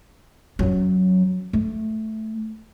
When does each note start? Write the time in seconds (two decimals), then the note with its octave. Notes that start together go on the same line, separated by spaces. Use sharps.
0.59 F#2 F#3
1.53 A3